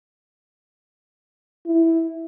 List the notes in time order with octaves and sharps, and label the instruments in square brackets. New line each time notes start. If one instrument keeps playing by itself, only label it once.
[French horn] E4